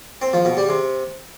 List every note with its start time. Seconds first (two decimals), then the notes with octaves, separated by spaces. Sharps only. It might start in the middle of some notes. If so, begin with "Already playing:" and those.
0.22 C4
0.33 F3
0.45 B2
0.57 G3
0.69 C3